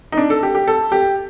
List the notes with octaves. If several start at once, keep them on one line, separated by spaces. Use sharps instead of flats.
D#4
D4
A4
G4
G4
A4
G4